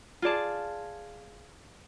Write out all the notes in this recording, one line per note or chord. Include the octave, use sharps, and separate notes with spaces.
F4 G#4 D5 A5